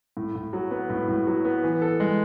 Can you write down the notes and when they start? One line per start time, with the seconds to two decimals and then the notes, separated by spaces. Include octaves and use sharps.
0.17 A2
0.35 A2
0.53 F#3
0.71 B3
0.90 A2
1.08 A2
1.27 F#3
1.45 B3
1.63 E3
1.82 A4
2.00 G#3